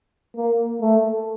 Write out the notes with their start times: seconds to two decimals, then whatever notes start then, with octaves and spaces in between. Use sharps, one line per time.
0.37 A#3
0.81 A3